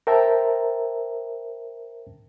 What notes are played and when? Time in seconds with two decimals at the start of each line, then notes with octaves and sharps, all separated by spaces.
0.07 A#4 C5 E5 G5 A5 A#5